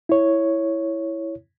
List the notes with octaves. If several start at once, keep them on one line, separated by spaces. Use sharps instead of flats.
E4 C#5